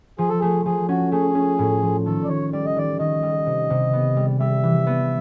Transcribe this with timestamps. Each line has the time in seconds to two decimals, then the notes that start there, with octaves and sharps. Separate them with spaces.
0.18 F3 G#4
0.29 A4
0.40 A3 G#4
0.65 F3 G#4
0.89 C#4 F#4
1.12 A3 G#4
1.35 C#4
1.59 A2
1.82 F3
2.06 D#3 A4
2.24 D5
2.29 D#3 C#5
2.53 G3 D5
2.65 D#5
2.76 D#3 D5
2.99 D#3 D#5
3.22 G3
3.46 C3
3.70 C3
3.93 B3
4.16 G3
4.40 G3 E5
4.63 E3
4.86 B3